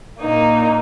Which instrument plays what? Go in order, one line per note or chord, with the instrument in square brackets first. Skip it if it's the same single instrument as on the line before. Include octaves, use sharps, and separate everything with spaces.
[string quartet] A#2 A#3 D#4